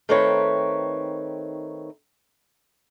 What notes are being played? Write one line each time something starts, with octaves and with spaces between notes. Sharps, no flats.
D#3 A3 C4 D#4 B4 C#5